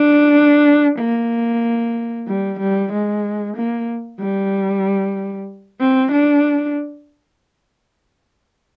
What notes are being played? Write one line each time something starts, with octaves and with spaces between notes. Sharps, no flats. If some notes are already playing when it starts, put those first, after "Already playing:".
Already playing: D4
A#3
G3
G3
G#3
A#3
G3
C4
D4